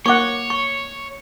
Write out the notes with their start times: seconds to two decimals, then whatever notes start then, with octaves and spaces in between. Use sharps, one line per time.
0.06 A#3 C#5 F#5 C#6 D6
0.50 C#6